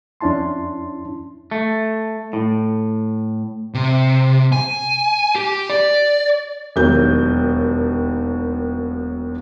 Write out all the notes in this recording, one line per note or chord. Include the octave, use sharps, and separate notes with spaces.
F2 C#4 D4 E4 A5 C6
A3
A2
C3
G#5
G4
D5
E1 D#2 F#3 G6